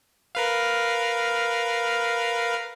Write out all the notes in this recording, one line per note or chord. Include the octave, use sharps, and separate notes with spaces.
A#4 B4 F5